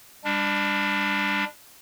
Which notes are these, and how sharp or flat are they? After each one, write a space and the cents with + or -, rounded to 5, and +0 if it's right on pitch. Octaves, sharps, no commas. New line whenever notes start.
G3 +30 D4 +0